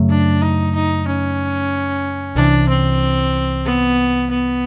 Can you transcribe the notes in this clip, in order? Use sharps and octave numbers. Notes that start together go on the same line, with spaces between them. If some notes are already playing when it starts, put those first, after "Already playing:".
Already playing: F#2 C#3 F#3 A3
D4
D#4
D#4
C#4
C2 C3 E3 D4
C4
B3
B3